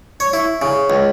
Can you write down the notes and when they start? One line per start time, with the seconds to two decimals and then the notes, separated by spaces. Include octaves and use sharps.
0.20 C#5
0.33 E4
0.62 C#3
0.90 C#2